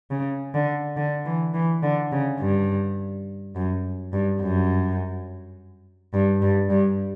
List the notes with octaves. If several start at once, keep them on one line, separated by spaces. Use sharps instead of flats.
C#3
D3
D3
E3
E3
D3
C#3
G2
F#2
G2
F#2
G2
G2
G2